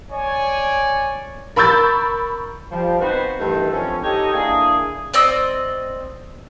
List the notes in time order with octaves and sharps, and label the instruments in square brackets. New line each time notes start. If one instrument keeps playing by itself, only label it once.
[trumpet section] C#5 D5 G#5
[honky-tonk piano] A#4 B5 C#6 E6 G6 A6
[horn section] F3 G3
B3 C4 D#4 F#4 B4 C5
G2 D#3 E3 A3 A4
D3 F3 C4 C#4
D#4 G4 A4 C#5 D#5
A#3 D4 E4 G#4
[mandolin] C4 D5 D#5 E6